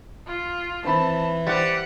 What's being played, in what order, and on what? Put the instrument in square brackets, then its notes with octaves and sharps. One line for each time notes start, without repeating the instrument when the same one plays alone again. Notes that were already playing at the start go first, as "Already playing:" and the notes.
[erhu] F4
[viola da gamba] E3 [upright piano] C4 B5 [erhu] A5
[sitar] G3 [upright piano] C5 A6 [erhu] F#5